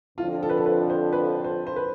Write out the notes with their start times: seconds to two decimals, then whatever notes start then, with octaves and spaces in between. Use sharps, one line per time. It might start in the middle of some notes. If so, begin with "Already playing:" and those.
0.18 F2 D3 F3 F4
0.43 A4
0.50 B4
0.57 A4
0.66 B4
0.90 C5
1.13 B4
1.44 C5
1.67 C5
1.76 B4